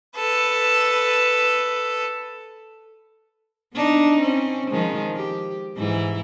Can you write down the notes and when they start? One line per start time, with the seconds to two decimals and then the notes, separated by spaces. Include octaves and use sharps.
0.16 A4 B4
3.74 B3 D4 D#4
4.18 C4 C#4
4.71 D#3 F3 G#3
5.16 G4
5.78 G#2 E3 E4